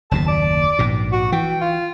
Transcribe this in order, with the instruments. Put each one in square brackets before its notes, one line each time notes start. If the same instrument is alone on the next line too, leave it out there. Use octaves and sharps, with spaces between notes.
[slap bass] F#1 D#2 B2 [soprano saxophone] A5
[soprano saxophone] D5
[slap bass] A#1 G#2 B2
[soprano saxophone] F#4
[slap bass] E3 [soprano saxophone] G5
[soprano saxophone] F4